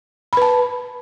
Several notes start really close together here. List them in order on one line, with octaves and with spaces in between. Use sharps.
B5 B4 A5